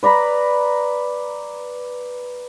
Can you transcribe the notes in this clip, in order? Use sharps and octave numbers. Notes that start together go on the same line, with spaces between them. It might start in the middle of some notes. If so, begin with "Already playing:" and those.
B4 D5 A#5 B5